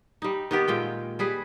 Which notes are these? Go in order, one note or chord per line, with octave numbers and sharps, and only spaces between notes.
G3 D#4
D#3 B3 G4
A#2 G#3 G5
G3 G#4 B4